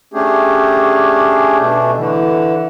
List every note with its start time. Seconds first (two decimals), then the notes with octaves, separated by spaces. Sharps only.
0.14 A3 C#4 D4 G4 G#4
1.59 B2 A3 D4
1.97 D3 E3